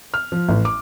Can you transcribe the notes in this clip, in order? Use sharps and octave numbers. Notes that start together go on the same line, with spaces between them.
F6
F3
A1
D6